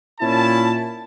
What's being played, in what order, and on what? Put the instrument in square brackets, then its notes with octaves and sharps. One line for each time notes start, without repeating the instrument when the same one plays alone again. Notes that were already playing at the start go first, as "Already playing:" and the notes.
[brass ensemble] A#2 C#4 E4 A5